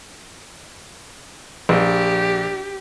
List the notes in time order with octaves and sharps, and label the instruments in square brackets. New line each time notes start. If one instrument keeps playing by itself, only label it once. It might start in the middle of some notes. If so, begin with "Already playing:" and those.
[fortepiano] A#1 [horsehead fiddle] G4